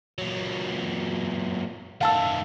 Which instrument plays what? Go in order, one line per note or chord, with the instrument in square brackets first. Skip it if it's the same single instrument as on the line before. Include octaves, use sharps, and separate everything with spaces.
[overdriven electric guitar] A#2 F#3
[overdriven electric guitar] D#3 A3 [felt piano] F5 A5 E6